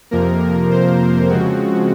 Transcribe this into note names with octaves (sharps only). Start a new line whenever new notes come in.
F2 C3 F3 A#3 A#4
C5
C#3 F3 G#3 C4 F#4